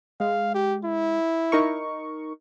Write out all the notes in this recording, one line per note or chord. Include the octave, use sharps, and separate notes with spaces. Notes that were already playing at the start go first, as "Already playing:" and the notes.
G#3 F5
G4
E4
D#4 A#4 C#6